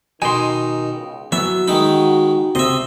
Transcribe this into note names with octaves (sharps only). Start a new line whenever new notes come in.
B2 D#3 D#4 G#5 C6
C#2
E3 F#3 B3 F#4 E5
D#3 G#3 D#4 B5
C#2 C3 C4 D#5 E5